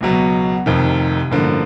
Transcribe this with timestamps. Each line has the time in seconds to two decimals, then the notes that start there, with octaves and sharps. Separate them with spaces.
0.01 C#2 B2 F#3 B3
0.66 F1 F2 C3 D#3
1.31 A1 G2 D3 F3 A#3